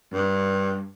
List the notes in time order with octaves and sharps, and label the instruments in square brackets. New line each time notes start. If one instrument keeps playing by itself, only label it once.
[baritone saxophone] G2